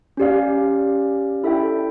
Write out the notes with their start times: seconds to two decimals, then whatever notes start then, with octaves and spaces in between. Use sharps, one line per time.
0.17 C#4 G4 D5 F5
1.44 E4 A4 E5 G5